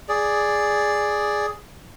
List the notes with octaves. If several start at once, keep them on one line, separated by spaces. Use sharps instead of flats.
G#4 D5